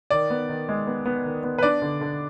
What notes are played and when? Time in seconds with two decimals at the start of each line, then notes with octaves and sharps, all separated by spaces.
0.10 D#3 D5
0.30 B3
0.49 D#3
0.69 G#3
0.87 B3
1.05 B3
1.25 D#3
1.44 B3
1.58 B4
1.63 D4 D5
1.82 D3
2.01 D3